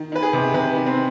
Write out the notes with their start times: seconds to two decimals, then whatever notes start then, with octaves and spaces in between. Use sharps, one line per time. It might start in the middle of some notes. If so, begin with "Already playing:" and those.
Already playing: D#3
0.12 D#3 B4
0.22 G#4
0.33 C3
0.54 C3 B4
0.76 D#3
0.86 C4